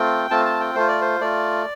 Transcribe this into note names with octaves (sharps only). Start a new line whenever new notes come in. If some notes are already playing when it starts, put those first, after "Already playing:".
Already playing: A3 C4 F4 G5
A3 C4 F4 A5
A5
G5
A3 F4 C5
D5
C5
A3 F4 D5